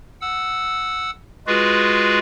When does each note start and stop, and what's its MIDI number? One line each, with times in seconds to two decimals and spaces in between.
0.21 1.11 78
0.21 1.11 88
1.47 2.19 56
1.47 2.19 65
1.47 2.19 66
1.47 2.19 68
1.47 2.19 71